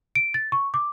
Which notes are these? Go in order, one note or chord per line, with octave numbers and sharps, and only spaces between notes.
D7
A6
C#6
D6